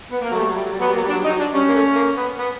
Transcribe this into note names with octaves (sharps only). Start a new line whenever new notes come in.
B3
A#3
F#3 A3
G3
F#3
G3
F#3
G3
F#3 B3
G3
A#3
F#3
G3
D4
F#3
G3
D#4
F#3
D4
G3 C#4
A#3
A3
A#3
B3
B3